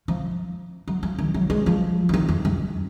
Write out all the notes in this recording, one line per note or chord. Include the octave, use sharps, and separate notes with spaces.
F3
F#3
F3
D#3
F#3
G#3
F3
F3
D#3
F2
F#2